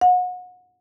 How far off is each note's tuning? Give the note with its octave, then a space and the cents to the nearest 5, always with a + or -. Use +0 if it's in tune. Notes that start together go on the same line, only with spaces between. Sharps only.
F#5 -30